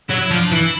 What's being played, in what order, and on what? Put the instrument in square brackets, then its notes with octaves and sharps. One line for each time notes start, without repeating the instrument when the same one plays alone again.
[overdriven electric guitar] F#3 [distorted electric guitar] E4
[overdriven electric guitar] F3 [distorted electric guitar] D4
[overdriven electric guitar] E3 [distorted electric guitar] E4